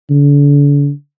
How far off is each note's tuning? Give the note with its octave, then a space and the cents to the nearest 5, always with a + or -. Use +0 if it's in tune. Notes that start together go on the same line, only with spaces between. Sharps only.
D3 -40